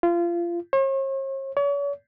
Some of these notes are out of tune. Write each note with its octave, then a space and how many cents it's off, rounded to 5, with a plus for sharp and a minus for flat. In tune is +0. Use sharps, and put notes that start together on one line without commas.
F4 -25
C#5 -45
C#5 +40